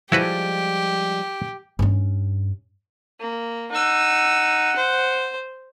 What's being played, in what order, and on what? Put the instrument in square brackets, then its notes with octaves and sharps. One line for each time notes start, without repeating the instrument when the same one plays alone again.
[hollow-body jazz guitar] F3 G3 G#3 [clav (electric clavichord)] E4 F#4 B4 [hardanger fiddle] G4
[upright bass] G2 C#4
[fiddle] A#3
[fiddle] D#4 E6 [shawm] F#5
[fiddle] C5